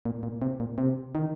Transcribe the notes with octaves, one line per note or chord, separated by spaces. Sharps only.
A#2
A#2
C3
A#2
C3
D#3